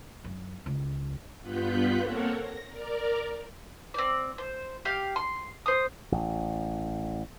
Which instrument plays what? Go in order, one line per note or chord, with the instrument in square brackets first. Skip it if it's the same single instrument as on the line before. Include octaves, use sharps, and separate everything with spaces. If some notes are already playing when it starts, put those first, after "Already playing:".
[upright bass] F#2
C#2
[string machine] G2 B3 F4 F#6 G6 B6
A#3 C4 A4 A#4 C#5 F#5
A#6
A#4 D5 A#5
[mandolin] C4 D5
C5
G4 F5
C6
C5 D#6
[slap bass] A1